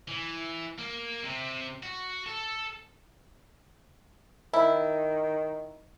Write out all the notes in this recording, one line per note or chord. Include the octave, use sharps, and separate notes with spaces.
E3
A#3
C3
F#4
A4
D#3 E4